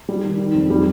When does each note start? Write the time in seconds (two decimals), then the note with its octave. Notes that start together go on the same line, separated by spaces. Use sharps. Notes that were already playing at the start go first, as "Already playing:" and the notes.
0.09 G3
0.24 D#3
0.39 D#3
0.54 F2
0.70 G3